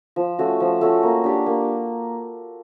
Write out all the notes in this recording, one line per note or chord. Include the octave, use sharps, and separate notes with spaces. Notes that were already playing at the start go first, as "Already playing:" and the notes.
F3
A3 C#4 F#4
F3
A3 C#4 F#4
A#3
D4 G4
A#3